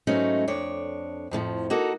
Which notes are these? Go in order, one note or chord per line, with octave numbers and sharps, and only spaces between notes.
G#2 F#3 A3 C#4 D#4
F2 D4 C#5
F2 A2 D3 F3
A#3 D#4 F#4 A4